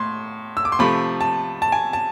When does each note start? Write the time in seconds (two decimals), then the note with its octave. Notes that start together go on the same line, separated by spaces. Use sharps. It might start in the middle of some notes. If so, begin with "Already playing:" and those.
Already playing: A2 C6
0.57 E6
0.65 D6
0.72 C6
0.79 C3 F3 A3 B5
1.21 A5
1.62 A5
1.72 G#5
1.93 A5